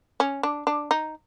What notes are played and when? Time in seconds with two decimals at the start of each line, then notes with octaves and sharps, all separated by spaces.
0.20 C#4
0.43 D4
0.67 D4
0.91 D#4